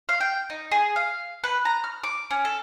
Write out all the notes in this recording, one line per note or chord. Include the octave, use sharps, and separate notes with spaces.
F5
G5
D#4
G#4
F5
B4
A#5
F6
D6
C#4
A4